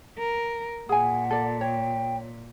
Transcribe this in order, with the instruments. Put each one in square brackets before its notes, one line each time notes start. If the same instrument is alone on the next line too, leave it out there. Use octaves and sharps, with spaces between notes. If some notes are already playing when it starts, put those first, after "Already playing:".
[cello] A#4
[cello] A#2 [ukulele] G#4 G#5 [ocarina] F#5
[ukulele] A4 D5
[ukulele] C#5 [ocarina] G5